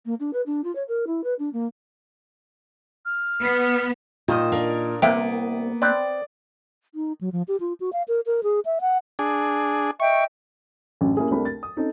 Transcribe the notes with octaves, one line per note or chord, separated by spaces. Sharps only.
A#3
D4
B4
D4
F4
C#5
A#4
E4
B4
D4
A#3
F6
B3
A#2 D#3 C5 D#5 D#6
D4 A#4 F5
C2 C3 A#3 B3 E5 F5 G5 D7
C4 B4 D5
D#4
F#3
F3
G4
F4
F#4
F5
A#4
A#4
G#4
E5
F#5
D4 G#4
D#5 E5 G5 C#6
A1 F#2 D3
A#3 C#4 E4 G4 G#4
C2 A3 D4 A#4 B5
A6
D#6
C4 C#4 D#4 A4